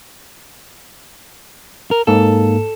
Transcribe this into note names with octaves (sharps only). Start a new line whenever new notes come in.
A#4
G#2 A#3 A4